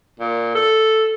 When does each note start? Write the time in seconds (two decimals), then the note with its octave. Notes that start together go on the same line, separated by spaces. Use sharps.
0.19 A#2
0.55 A4